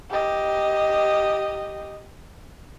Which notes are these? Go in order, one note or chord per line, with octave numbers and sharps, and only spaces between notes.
G4 D#5